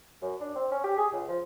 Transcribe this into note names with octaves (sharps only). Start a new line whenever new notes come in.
F#2
D4
C4
C#4
G4
G#4
C#2
F3